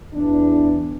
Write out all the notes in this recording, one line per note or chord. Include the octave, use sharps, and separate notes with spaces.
E2 E3 D4